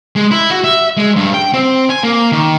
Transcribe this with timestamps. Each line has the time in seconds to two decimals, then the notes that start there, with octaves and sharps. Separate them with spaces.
0.16 G#3
0.31 E4
0.51 F#4
0.64 E5
0.97 G#3
1.16 G2
1.34 G5
1.54 C4
1.90 G#5
2.03 A#3
2.32 D#3